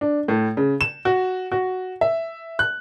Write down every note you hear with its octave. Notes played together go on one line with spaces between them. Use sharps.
D4
A2
C#3
E7
F#4
F#4
E5
F#6